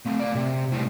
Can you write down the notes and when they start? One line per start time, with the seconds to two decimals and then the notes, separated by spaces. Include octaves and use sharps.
0.06 A3 C4
0.20 A#4 D5
0.35 C3
0.72 A2 G3